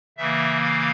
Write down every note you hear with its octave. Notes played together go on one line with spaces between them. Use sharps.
C#3 E3 A#3 E5
F5